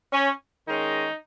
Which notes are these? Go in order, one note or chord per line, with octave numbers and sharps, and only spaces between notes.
C#4
D#3 G#3 C#4 D#4